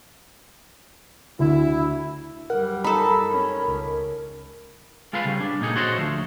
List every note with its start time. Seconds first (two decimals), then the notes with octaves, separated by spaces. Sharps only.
1.39 D2 E4
2.50 F#2 G3 A#4 F#5
2.84 D#4 A4 B5
3.32 C#4
3.65 C#2
5.13 G#3 F4 A4 B4 F5
5.25 C#3 G3 C#4
5.41 D4
5.61 A#2 D#4 G#4 A4
5.76 F#4 A4 C5 C#5 D#5
5.98 D2 F3